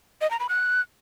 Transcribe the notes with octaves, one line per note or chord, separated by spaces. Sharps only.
D#5
A#5
B5
F#6